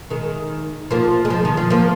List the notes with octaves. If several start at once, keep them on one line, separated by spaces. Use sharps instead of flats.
D#3 G#3
F3 A#3
G#3
F3
D#3
F3
F3 A#3